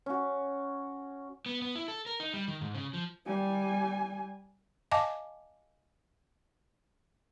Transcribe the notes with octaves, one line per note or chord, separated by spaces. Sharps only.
C#4 F#4
B3
B3
E4
A4
A#4
D#4
G3
D#3
G#2
C#3
F3
G3 G#5
D#5 F5 G#5 A5 D6